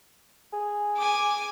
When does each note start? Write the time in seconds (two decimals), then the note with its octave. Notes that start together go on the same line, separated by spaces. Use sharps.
0.53 G#4
0.97 G#5 D6